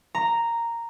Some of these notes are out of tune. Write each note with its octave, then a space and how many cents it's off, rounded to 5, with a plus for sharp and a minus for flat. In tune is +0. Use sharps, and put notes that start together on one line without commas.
A#5 -5